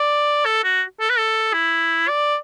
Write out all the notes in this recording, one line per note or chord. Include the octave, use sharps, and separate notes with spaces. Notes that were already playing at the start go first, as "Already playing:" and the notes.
Already playing: D5
A4
F#4
A4
B4
A4
E4
D5